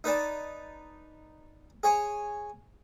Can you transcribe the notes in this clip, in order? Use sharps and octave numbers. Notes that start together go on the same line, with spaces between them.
D#4 B4 D5 A5
G#4 C#5 G#5